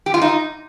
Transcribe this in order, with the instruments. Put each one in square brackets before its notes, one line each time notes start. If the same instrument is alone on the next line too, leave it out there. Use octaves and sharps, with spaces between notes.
[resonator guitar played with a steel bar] G4
F4
D#4